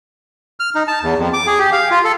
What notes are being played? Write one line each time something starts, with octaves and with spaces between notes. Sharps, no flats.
F6
D#4
A5
E2
F2
D6
G#4
G4
F5
F4
A4